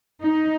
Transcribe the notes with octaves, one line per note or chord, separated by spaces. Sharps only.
D#4